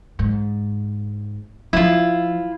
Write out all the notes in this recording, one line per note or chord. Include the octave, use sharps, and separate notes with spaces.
G#2
F3 E4 F4